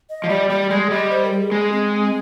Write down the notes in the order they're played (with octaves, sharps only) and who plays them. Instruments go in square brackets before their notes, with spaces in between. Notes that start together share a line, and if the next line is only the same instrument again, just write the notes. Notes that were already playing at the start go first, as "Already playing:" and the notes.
[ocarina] D#5
[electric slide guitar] F3
[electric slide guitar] G3 [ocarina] D5
[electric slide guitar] G3 [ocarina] D5
[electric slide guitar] G#3 [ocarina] D5
[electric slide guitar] G3 [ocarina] D#5
[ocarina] C5
A#4
G#4
[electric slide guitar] G#3
[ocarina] C4